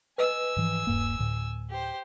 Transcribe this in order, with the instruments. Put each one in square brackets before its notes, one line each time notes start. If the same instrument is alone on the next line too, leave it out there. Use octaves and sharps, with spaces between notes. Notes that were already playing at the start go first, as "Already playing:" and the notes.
[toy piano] B4 D#5 [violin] G#5 E6
[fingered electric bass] G#2 E3 F3
D#1 G2 A#3
D2 A2
[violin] G4 C5